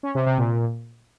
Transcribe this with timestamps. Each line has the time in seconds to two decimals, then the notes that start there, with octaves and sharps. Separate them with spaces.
0.03 C#4
0.15 C3
0.26 C3
0.38 A#2